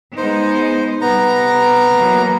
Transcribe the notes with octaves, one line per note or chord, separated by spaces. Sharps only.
G#3 B3 D#4 C5
C3 G3 B3 A#5
E3 F#3 A#3